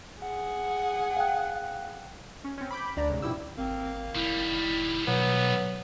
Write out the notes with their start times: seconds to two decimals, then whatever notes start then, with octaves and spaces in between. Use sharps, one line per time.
0.20 G#4 F#5
1.16 F5 G5 F#6
2.44 C#4
2.58 C4 C#4
2.71 B5 D6 G6
2.97 D2 D4 D5 A#5
3.10 C2 G#2 C#3
3.22 G2 B2 F3 E4 G4 E6
3.58 G#1 A#3 C4
4.15 F1 D#3 G3 E4
5.07 B2 F#3 B3